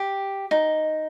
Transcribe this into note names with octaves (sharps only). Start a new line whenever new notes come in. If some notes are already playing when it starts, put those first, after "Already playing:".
Already playing: G4
D#4